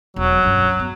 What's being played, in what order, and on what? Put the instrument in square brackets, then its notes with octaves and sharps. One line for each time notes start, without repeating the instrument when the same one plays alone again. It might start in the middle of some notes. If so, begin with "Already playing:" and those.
[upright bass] E1 D#3 [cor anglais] F#3
[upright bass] C#2 G2
B3